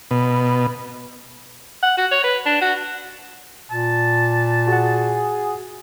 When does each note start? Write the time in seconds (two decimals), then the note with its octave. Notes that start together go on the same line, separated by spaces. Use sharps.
0.11 B2
1.83 F#5
1.98 F#4
2.11 C#5
2.24 B4
2.46 D4
2.62 F#4
3.71 A#2 A5
4.68 F#4 G#4 F#5